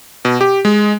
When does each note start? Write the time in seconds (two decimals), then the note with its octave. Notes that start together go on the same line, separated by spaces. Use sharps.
0.25 B2
0.41 G4
0.65 G#3